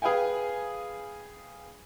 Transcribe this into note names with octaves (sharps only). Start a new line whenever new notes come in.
G#4 B4 F5 G5 G#5